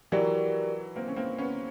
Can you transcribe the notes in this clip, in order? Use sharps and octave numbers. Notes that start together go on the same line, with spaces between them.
E3 F#3 G4 A#4 D5
A#3 C4
C#4
A#3 C4
B3 C#4